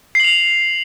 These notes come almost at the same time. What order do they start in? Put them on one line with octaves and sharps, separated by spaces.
C7 F#7 F7